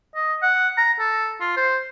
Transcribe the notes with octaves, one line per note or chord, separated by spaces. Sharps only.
D#5
F#5
A#5
A4
F4
C5